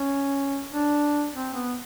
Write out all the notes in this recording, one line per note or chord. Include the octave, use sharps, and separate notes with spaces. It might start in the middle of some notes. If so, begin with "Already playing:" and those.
Already playing: C#4
D4
C4
B3